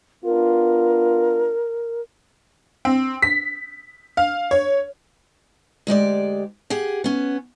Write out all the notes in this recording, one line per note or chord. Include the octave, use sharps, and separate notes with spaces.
B3 D4 F4 A#4
C4
B6
F5
C#5
D2 G#3 G4 D5
G4 G#4 F#5
B3 C#4